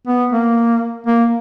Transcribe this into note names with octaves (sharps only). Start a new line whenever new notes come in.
B3
A#3
A#3